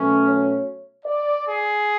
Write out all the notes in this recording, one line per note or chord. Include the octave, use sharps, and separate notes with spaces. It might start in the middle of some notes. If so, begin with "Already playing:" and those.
Already playing: B2 F#3 A3 C#4
C#5
D5
G#4